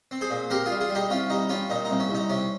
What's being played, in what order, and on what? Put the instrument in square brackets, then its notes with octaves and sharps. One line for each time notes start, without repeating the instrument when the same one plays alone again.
[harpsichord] C4
G#4 C5
A#2
C4 G4 A#4
G3 F4 G#4
F4 G#4
G3
D#4 G4
C2 C#4 F4
G3 D#4
G3 C#4 F4
A#2 D#4
C2 D#4
C#4
C2
D#4
C3 C#4